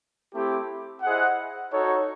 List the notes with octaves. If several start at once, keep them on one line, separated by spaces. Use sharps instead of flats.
A3 C4 E4 G4
E4 G#4 C5 D#5 F#5
D#4 F#4 A4 C#5